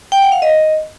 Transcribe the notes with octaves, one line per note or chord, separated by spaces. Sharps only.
G5
F#5
F5
D#5